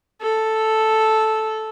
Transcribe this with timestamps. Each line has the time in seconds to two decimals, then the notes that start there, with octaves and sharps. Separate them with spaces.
0.21 A4